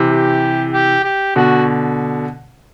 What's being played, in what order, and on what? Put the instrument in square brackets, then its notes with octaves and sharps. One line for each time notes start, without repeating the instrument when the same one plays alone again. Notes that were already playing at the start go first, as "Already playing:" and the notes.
Already playing: [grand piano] C3 E3
[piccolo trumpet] G4
G4
G4
[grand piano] B2 D3 [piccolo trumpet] F#4